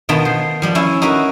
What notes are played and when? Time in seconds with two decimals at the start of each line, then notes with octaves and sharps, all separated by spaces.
0.09 B2 D#3 B3 F4 A5
0.25 C5
0.62 F3 G3 G4
0.75 C#4 E4
1.02 D#4 F#4 A#4 B4